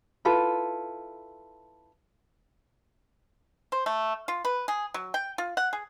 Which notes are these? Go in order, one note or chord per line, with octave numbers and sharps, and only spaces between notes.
E4 F4 A4 B4
C5
A3
F4
B4
G#4
F#3
G5
F4
F#5
G#4